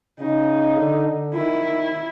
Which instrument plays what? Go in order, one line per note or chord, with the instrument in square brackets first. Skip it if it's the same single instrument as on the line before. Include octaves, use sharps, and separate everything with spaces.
[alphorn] C#3 [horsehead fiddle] D#4
[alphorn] D3
D3
[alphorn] D#3 [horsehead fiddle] E4
[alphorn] D#3